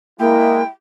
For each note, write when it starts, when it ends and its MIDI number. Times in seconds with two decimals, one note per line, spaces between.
0.20 0.64 56
0.20 0.62 58
0.20 0.64 64
0.20 0.66 79